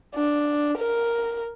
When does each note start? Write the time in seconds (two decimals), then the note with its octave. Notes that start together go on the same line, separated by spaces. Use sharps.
0.14 D4
0.78 A#4